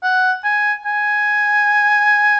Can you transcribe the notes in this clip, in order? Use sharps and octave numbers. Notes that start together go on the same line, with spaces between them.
F#5
G#5
G#5